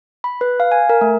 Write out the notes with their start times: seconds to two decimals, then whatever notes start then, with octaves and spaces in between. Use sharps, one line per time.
0.24 B5
0.41 B4
0.60 F5
0.72 G#5
0.89 A#4
1.01 A3